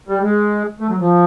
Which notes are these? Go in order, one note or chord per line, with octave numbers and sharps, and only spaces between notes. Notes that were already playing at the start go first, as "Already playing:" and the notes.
G3
G#3
A3
F#3
F3